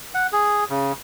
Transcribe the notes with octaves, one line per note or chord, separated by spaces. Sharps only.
F#5
G#4
C#3